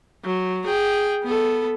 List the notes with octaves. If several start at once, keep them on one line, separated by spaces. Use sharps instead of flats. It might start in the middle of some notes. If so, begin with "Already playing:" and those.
F#3
G#4 G5
B3 A4